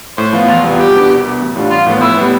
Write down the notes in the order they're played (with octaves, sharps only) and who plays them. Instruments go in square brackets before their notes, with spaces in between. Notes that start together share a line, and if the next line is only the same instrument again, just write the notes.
[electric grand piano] A2 [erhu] C5
[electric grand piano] F3 B3 F4
[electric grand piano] E2 [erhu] F4
[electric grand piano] C3 G3 B3 F4
[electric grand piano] B2 [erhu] G4
[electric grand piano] G3 B3 D4
C2
B2 B3
A1
A2 G3 D4 F4
[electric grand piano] A1 [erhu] F4
[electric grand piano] A2 F3 B3
[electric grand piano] A2 [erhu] E4
[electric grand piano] G3 B3